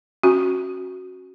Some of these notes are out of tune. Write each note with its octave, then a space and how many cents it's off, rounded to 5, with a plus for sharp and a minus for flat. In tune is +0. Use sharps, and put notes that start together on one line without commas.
C#4 -25 F#4 +0